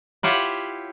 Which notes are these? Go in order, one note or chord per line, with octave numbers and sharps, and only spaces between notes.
E4 F4 G4 C#5 F#5